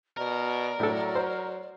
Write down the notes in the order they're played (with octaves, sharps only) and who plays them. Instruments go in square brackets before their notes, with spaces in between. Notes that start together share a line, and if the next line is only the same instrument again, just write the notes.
[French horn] B2 [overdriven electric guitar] A#4 [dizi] D5
[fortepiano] A2 A4 [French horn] F#3
[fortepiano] C5